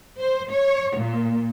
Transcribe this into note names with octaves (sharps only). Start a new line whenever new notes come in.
C5
C#5
A#2